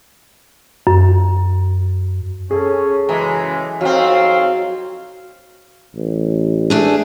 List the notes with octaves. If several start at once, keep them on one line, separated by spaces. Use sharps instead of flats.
F#2
C#4 G#4 A4
F#2 C#3 E3 G#3 A#5 D6
F2 F#3 C4 D#4 C#5 F5
A1
A3 D4 G#4